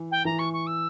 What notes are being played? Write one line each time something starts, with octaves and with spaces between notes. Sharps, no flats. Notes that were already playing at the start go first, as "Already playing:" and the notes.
Already playing: E3
G5
E3 A#5
C#6
C#6
E6